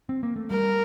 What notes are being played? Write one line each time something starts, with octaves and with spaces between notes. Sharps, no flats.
C4
A#3
A3
G3 A#4